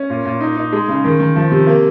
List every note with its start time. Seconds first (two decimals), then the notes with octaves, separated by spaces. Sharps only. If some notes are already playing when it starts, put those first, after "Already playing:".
Already playing: C#4
0.10 A#2
0.25 A#2
0.41 D#4
0.57 D#4
0.73 G#3
0.88 C#3
1.04 D#3
1.20 D#3
1.36 F3
1.52 C3
1.67 A#3